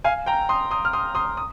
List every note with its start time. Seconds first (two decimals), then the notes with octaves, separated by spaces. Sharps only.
0.04 F5 G#5
0.26 G5 A#5
0.49 C6 D#6
0.71 C6 D#6
0.85 F6
0.93 C6 D#6
1.15 C6 D#6
1.37 D#6